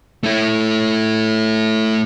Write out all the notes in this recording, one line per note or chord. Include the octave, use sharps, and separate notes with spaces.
A3 E4